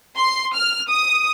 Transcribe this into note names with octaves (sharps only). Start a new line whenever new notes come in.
C6
F6
D#6